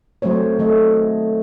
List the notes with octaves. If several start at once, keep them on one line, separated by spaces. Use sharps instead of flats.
F#3 A3 C4 C5 C#5
D#3 A3 A4 D#5